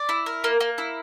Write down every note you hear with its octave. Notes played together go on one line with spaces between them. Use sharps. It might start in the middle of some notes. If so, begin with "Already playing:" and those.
Already playing: D5
E4
A#4
A#3
A#3
E4